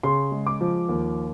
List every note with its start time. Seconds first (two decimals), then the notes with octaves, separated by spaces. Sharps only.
0.03 C#3 C6
0.32 G#3
0.46 D6
0.61 F3
0.89 D#2